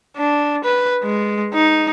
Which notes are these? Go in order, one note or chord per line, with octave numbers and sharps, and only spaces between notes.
D4
B4
G#3
D#4